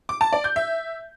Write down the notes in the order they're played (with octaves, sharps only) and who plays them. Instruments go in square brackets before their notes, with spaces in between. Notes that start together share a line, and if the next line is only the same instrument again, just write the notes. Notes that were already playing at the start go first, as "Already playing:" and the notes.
[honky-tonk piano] D6
A5
D5
G6
E5